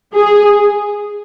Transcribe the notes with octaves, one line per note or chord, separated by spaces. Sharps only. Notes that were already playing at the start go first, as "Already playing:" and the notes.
G#4